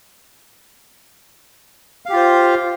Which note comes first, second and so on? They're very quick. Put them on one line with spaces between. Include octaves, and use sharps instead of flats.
F5 G4 F4 C5